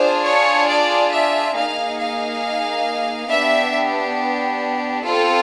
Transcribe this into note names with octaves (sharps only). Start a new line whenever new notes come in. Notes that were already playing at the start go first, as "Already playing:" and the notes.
Already playing: D4 F4 G#4 C5
C#5
D5
E5
A#3 D#4 G#4 F5
F5
B3 D4 G4 E5
C4 F4 A4